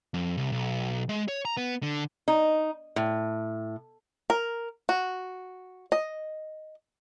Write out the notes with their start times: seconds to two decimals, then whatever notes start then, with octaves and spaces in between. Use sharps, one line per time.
0.14 F2
0.37 C2
0.52 B1
1.09 G#3
1.28 C#5
1.45 A#5
1.57 B3
1.83 D3
2.28 D#4
2.96 A2
4.30 A#4
4.89 F#4
5.92 D#5